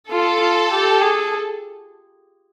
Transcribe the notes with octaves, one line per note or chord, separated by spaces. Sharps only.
F4 A4
F4
G4
G#4